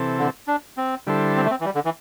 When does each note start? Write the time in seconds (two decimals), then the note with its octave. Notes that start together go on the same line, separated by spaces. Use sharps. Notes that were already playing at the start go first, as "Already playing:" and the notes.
Already playing: C3 E3 C4 A4
0.19 D3
0.47 D4
0.77 C4
1.07 D3 G3 E4 A4 C5
1.36 C4
1.45 A3
1.51 C4
1.60 E3
1.65 G3
1.75 D3
1.85 E3